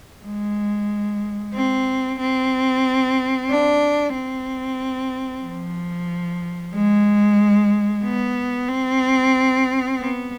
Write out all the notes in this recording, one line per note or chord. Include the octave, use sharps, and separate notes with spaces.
G#3
C4
C4
D4
C4
F3
G#3
B3
C4
B3